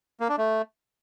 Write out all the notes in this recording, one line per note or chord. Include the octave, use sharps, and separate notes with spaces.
A#3
D4
A3